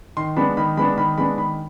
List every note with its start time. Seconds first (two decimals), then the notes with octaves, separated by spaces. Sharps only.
0.17 D#3 C6
0.36 G#3 B3 D4 B5
0.57 D#3 B5
0.77 G#3 B3 D4 B5
0.97 D#3 B5
1.18 G#3 B3 D4 B5
1.37 D#3 B5